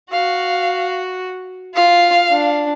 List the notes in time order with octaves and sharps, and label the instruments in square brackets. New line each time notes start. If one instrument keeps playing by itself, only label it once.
[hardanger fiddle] F#4 [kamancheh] F5
[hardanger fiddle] F4 [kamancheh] F5
[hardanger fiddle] D4